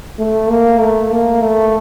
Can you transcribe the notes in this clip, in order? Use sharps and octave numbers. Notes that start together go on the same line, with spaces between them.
A3
A#3
A3
A#3
A3